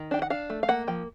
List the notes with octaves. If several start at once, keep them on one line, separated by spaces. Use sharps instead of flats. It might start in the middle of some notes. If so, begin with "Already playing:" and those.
Already playing: D#3
D4 G5
F#5
D4 F5
A3
F5
A#3 F#5
F3 G5